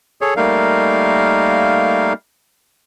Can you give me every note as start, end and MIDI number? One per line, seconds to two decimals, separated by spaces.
0.21 0.34 68
0.21 0.34 69
0.21 0.34 73
0.37 2.13 55
0.37 2.13 57
0.37 2.13 58
0.37 2.13 63
0.37 2.13 70
0.37 2.13 77